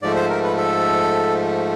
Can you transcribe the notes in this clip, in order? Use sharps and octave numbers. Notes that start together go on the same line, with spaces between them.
G#2 F3 A3 D5
C5
A#4
B4
A4